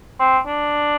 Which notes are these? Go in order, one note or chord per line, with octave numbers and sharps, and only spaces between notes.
C4
D4